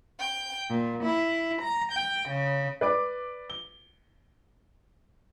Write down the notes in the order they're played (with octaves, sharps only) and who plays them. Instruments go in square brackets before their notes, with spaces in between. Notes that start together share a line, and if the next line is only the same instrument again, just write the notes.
[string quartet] G5
A#2
E4
A#5
G5
C#3
[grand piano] B4 D5 D6
G7